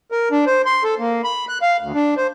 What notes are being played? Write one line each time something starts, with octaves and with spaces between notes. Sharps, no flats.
A#4
D4
C5
C6
A4
A#3
B5
F#6
F5
D2
D4
C5